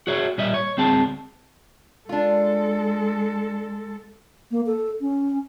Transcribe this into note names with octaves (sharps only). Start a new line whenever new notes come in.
F#4 G#4 C#5 E5
A#2 G3 D#5 E5
C#5
D2 C4 G#4 A5
G#3 D4 F4 A4
A#3
A4
C#4